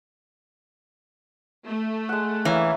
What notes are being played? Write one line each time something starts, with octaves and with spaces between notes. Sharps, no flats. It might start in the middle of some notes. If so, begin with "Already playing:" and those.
A3
G#3 F#5
E3 A#3 C#4